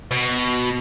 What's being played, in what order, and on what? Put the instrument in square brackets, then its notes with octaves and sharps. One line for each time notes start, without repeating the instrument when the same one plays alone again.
[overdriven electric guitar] B2